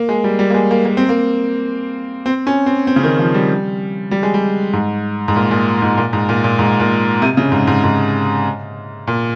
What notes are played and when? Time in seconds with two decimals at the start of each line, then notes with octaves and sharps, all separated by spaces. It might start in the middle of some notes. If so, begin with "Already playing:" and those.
Already playing: A#3
0.09 G#3
0.24 G3
0.39 G3
0.50 A#3
0.54 G#3
0.71 A#3
0.85 A#3
0.97 C4
1.09 A#3
2.26 C4
2.47 C#4
2.66 C4
2.87 C4
2.96 C#3
3.03 D#3
3.19 F3
3.34 G3
4.11 G3
4.23 G#3
4.34 G3
4.73 G#2
5.28 G#2
5.36 A#2
5.51 A#2
5.82 G#2
5.98 A#2
6.13 G#2
6.29 A#2
6.44 A#2
6.59 G#2
6.80 A#2
7.22 C3
7.37 C#3
7.52 G#2
7.67 G#2
7.84 G#2
9.07 A#2